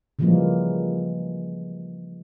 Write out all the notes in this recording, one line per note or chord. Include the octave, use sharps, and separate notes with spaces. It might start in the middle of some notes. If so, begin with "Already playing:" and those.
C#3 E3 F3 G3 G#3 A#3